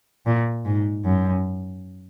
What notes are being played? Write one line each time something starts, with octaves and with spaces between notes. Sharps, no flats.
A#2
G#2
F#2